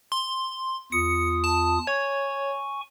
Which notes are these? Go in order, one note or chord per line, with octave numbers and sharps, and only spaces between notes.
C6
E2 F4 D#6 C#7
A5
C#5 G#5 C#6